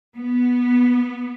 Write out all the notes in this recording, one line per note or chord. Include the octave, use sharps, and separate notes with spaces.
B3